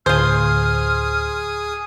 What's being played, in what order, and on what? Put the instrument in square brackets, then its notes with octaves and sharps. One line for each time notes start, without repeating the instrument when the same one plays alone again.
[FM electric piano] D2 A2 C6 [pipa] F4 C5 [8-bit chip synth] G#4 D#6 [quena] F6